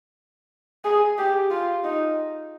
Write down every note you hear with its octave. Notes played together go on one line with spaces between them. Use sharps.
G#4
G4
F4
D#4